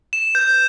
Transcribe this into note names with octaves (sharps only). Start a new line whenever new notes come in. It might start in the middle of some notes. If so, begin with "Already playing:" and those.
E7
G6